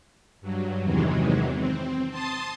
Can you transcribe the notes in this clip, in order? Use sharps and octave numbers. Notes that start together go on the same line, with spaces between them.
G2 F#3
E2 C3 D#3 E3 F#3 G#3
C4
A5 C6 D#6 A6